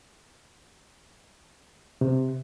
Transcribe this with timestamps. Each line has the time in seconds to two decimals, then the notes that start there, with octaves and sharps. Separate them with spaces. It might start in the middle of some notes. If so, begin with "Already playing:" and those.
2.01 C3